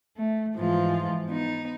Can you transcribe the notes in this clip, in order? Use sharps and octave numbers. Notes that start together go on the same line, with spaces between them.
A3
G#2 E3 F3 G#3 F4
B3 D#4